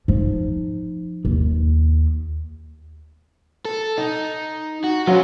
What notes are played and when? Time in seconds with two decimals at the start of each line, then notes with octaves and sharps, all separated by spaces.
0.08 F3 D#4
1.25 D#2
3.65 A4
3.98 D#4
4.84 F#4
5.07 F#3 C#4 F4